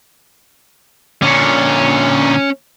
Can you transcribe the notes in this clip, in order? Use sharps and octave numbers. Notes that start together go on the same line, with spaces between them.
A#2 D3 C#4 C#5